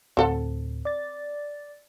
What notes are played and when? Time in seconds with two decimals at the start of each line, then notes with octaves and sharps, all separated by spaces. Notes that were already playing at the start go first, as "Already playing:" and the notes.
0.17 D2 A2 C4 A4 F#5
0.85 D5 A6